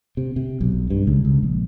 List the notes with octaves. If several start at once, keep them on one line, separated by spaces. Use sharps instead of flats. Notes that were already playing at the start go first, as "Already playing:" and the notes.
C3
C3
B1
G2
C#2
C#2
A#1